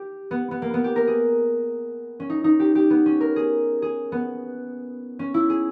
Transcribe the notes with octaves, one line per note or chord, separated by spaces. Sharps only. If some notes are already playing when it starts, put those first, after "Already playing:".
Already playing: G4
B3
B3
A#3
B3
G4
A#4
G#4
C#4
D#4
D#4
G4
G4
B3
C#4
A#4
G#4
G#4
B3
C#4
E4
G#4